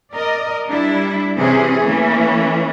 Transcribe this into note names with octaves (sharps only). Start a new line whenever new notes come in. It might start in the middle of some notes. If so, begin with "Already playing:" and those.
A#4 D5 D#5
G3 D4 E4
C3 E3 C4 C#4 G#4
E3 A3 A#3 C#4